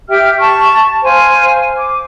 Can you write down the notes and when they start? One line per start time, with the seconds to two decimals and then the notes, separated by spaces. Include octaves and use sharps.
0.09 G4 E5 G5 F6
0.41 A5 C#6
1.03 C5 F5 G#5
1.79 D6